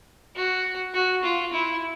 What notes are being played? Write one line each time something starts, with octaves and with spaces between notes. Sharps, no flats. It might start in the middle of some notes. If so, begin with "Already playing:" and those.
F#4
F#4
F4
E4